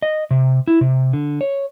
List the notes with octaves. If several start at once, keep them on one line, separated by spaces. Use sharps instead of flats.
D#5
C3
E4
C3
D3
C#5